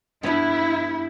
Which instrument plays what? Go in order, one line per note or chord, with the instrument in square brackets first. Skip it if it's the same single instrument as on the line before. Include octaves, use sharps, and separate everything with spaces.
[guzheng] G2 B3 [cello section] E4